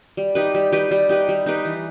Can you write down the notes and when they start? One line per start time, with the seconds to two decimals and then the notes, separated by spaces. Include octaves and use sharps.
0.17 G3
0.35 D#4 G4 B4
0.55 G3
0.72 D#4 G4 B4
0.91 G3
1.09 D#4 G4 B4
1.29 G3
1.46 D#4 G4 B4
1.65 E3